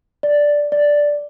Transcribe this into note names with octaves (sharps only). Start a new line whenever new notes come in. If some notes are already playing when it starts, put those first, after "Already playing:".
D5
D5